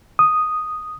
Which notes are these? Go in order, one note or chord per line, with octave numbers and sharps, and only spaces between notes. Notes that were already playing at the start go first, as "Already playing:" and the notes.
D#6